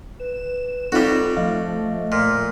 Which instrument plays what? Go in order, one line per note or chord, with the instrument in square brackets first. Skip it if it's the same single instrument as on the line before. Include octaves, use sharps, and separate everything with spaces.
[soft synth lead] B4 [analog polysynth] E7
[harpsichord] G3 F#4 [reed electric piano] C4 D#4 F4 [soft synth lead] A4
[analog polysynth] F3 A3 [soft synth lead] D#5 [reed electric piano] F5
[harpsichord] A#2 [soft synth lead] F6